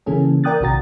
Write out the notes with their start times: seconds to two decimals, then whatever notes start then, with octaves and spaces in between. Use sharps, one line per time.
0.06 C#3 E3 A#3 C#4 G#4 A4
0.44 A#4 D5 G5 D#6 F#6 A6
0.61 A#1 C3 D#3 F#4 A#5 A6